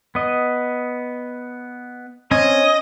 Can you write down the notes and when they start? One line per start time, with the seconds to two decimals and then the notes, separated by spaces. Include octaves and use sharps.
0.15 B3 D#5
2.31 C4 C#4 D#5 G#5